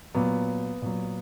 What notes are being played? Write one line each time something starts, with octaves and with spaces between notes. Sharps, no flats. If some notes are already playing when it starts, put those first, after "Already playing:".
A#2 F#3 B3
A#2 F#3